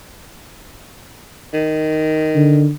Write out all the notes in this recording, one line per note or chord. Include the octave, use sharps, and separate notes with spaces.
D#3
D3